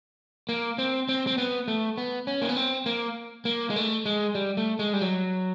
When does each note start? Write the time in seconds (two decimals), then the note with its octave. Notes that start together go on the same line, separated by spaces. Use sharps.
0.49 A#3
0.78 C4
1.09 C4
1.27 C4
1.38 B3
1.68 A3
1.98 B3
2.27 C#4
2.42 A#3
2.49 B3
2.57 C4
2.86 A#3
3.45 A#3
3.70 G#3
3.76 A3
4.06 G#3
4.35 G3
4.57 A3
4.79 G#3
4.93 G3
5.02 F#3